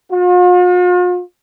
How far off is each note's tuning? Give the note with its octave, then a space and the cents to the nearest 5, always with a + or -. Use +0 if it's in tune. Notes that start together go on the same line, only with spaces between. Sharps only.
F4 +45